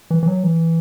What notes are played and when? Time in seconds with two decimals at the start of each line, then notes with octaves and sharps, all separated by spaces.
0.10 E3
0.23 E3
0.27 F#3
0.43 E3